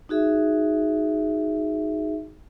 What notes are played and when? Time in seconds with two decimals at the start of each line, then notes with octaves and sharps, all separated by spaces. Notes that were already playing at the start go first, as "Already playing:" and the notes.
0.09 D#4 F#4 G#4 E5